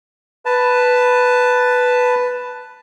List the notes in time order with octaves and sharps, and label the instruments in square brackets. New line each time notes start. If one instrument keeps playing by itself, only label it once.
[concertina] B4 A5